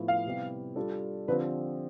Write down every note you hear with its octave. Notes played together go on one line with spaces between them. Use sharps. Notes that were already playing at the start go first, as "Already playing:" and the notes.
Already playing: A2 F3 B3 E4
F5
C3 G3 B3 E4 G4
G3 D4 F4 A4
D3 F3 C4 G4 B4